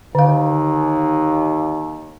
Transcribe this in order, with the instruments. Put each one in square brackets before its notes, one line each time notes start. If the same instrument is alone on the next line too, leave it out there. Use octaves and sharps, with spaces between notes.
[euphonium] D#2 [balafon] D3 F5